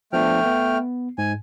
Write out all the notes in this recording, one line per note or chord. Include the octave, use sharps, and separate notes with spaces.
F3 A3 B3 D4 G5 F6
B3
G#2 G#5